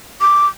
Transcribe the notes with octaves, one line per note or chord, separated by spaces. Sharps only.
D6